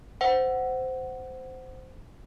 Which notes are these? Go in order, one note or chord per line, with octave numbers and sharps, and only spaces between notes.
C5 F#5